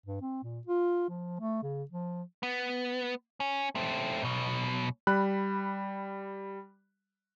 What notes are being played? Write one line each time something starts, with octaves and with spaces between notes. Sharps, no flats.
G2
C4
A#2
F4
F3
A3
C#3
F3
B3
C#4
A3 C4
B1 B2
G3 B5 F#6